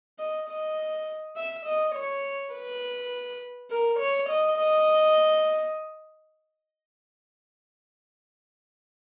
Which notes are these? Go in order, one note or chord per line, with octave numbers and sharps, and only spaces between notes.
D#5
D#5
E5
D#5
C#5
B4
A#4
C#5
D#5
D#5